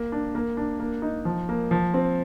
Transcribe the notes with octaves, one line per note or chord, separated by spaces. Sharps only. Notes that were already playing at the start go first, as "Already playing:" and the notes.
Already playing: A#3
D4
A#3
D4
A#3
D#4
F3
A#3
F3
C4